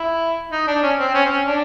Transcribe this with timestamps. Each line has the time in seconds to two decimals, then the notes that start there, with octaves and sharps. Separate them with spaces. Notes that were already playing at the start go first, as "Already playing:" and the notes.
Already playing: E4
0.52 D#4
0.67 D4
0.83 C#4
0.99 C4
1.14 C#4
1.25 C4
1.30 C#4
1.47 D4